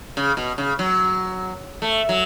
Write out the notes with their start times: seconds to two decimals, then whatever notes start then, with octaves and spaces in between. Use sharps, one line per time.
0.17 C#3
0.37 B2
0.58 C#3
0.79 F#3
1.82 A3
2.09 F#3